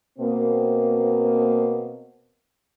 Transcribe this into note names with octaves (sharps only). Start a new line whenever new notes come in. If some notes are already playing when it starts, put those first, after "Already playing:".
B2 A#3 C4